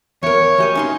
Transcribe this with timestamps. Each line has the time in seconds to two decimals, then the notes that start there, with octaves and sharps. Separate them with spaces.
0.23 E2 A#4 C#5
0.58 E3 G4 D#5
0.75 C#4 D#4 C6